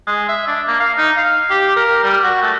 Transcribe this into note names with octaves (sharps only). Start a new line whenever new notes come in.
G#3
E5
D4
A#3
F5
D#4
F5
G4
A#4
G3
F#4
A3